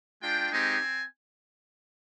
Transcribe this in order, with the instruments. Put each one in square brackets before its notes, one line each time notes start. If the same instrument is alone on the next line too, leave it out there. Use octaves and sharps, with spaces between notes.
[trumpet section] G#3 D4 F4 G5
G#3 C4 D#4 G4 G#5
C4